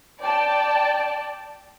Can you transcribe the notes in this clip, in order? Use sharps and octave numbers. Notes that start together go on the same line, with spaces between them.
D5 G5 A5